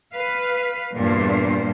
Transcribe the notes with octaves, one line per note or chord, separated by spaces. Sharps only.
B4 F5
E2 G2 A#2 C5